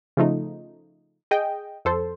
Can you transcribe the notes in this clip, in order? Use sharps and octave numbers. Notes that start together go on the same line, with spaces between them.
C#3 F3 A3 D#4
G#4 D#5 G5
F2 A4 C5